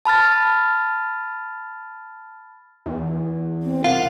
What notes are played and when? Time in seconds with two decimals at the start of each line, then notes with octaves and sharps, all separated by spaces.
0.05 A5 B5 F6 A6
2.86 E2
3.62 C4
3.84 C2 F4 A#4 F5 F#5